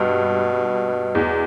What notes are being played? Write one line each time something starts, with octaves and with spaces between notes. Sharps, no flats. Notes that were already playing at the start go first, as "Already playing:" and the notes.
Already playing: G2 B2
E2